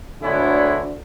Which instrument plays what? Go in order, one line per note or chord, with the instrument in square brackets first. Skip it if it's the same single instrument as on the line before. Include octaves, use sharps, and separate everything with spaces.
[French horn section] D2 D3 [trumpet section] G#3 B3 E4 G#4 C#5